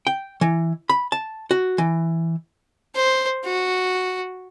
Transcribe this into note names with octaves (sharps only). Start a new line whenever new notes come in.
G5
E3
B5
A5
F#4
E3
C5
F#4